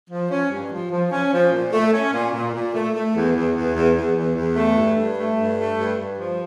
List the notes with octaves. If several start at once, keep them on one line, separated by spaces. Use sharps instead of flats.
F3
C#4
G2
F3
F3
C#4
F3
A#2
A3
C#4
A#2
A#2
A#2
A3
A3
E2
E2
E2
E2
E2
E2
E2
A3
G2
G2
A3
G2
A3
G2
G2
F3